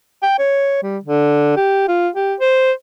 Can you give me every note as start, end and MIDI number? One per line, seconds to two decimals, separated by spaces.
0.23 0.36 79
0.39 0.81 73
0.83 0.98 55
1.04 1.54 50
1.57 1.86 67
1.88 2.08 65
2.16 2.34 67
2.40 2.72 72